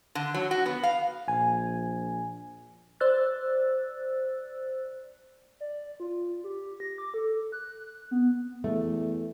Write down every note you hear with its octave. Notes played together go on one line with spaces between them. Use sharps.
D3
F#3
F#4
B3
F5
A#1 G#5
C5 D5 E6 F#6 A6
D5
F4
G4
A#6
D6
A4
F#6
B3
E2 A3